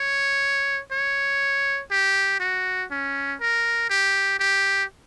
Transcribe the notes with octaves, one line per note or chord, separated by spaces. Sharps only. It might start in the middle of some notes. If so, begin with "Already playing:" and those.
Already playing: C#5
C#5
G4
F#4
C#4
A#4
G4
G4